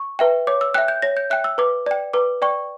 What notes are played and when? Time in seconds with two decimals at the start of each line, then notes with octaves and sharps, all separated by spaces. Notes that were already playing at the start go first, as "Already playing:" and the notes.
Already playing: C#6
0.19 B4 E5 G5
0.47 C#5 D6
0.61 E6
0.74 E5 G5 F#6
0.88 G6
1.02 C#5 A#6
1.17 G6
1.30 E5 G5 F#6
1.44 E6
1.58 B4 D6
1.86 D5 G5
2.13 B4 D6
2.42 D5 G5 C#6